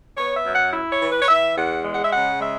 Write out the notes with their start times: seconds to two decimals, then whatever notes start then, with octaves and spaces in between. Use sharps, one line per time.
0.17 B3 C#5
0.36 E5
0.45 F#2
0.55 F#5
0.73 E4
0.91 C#5
1.01 E3
1.11 B4
1.21 C#5
1.28 E3 E5
1.56 E2 F#5
1.84 G#3
1.93 F#5
2.02 E5
2.11 C#3 F#5
2.41 G#3 E5